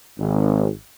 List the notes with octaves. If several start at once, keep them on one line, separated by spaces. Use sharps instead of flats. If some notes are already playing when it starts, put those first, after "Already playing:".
G#1